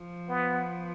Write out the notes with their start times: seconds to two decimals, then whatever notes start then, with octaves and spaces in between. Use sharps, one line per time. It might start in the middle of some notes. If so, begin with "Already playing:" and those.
Already playing: F3
0.29 B3